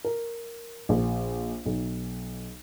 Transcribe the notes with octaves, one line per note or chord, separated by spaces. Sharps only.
A#4
A#1
B1